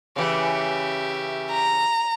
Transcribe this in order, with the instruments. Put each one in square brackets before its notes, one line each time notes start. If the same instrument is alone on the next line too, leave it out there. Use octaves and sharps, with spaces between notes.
[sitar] C#3 E3 [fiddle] G4 E5
[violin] A#5